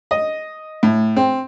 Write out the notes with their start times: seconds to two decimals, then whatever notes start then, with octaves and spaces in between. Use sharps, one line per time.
0.11 D#5
0.83 A2
1.16 C4